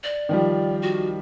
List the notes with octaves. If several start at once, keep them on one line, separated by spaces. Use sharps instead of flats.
D5
D#3 F3 G3
F#4